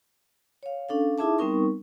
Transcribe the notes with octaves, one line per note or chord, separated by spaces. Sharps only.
C#5 F5
C#4 D4 A4 F5
D#4 E4 G#4 E5 A5 D6
G3 B3 C4 D#4 A#4 C#6